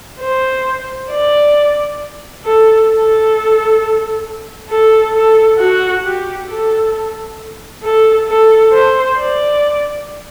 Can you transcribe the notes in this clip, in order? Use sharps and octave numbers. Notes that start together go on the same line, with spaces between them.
C5
D5
A4
A4
A4
A4
F#4
G4
A4
A4
A4
C5
D5